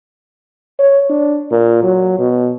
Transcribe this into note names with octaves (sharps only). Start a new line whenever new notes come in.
C#5
D4
A#2
F#3
B2